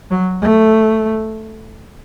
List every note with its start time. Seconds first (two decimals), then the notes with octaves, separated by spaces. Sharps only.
0.11 F#3
0.42 A3